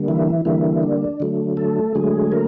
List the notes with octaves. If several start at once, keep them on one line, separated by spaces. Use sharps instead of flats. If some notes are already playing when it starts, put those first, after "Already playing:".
Already playing: D3 G3 A#3
E3 E4
D3 E3 G3 A#3 E4
D4
D3 F#3 A3
A3 A4
D3 F#3 G#3 A3 G#4
A#3 A#4